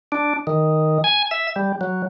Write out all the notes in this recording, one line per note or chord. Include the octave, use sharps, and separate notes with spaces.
D4
D#3
G#5
E5
G3
F#3